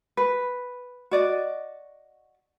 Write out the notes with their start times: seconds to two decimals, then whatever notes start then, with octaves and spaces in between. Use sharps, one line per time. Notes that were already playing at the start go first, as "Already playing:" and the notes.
0.17 B4
1.11 F#4 D5 D#5